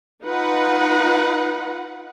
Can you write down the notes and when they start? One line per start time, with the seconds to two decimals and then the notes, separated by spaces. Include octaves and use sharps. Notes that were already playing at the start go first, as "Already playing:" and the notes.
0.23 D#4 F4 B4 F#5